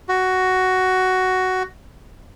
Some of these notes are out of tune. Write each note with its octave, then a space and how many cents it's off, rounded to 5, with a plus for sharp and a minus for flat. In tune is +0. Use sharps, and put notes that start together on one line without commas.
F#4 +10